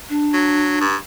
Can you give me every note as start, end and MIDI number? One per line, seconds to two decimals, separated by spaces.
0.09 0.84 62
0.34 0.78 54
0.81 0.96 43